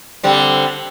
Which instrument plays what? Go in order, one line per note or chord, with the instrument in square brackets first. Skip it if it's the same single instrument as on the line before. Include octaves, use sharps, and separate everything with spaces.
[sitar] D3 G3 C4